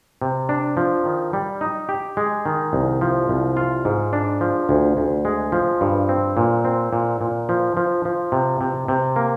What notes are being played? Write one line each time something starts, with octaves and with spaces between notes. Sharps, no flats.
C3
D4
F3
D#3
G3
D#4
G4
G#3
D#3
C2
F3
C2
F4
G#2
D4
F3
D2
D2
G#3
F3
G2
C4
A#2
C4
A#2
A#2
F3
F3
F3
C3
C3
C3
A#3